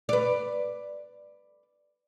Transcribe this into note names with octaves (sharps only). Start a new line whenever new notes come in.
B4 D5